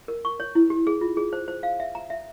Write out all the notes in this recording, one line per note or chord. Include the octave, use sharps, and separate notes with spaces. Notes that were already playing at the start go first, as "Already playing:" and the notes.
A#4
C#6
C#5
E4
G4
G#4
F4
G#4
C5
C5
F5
E5
A#5
E5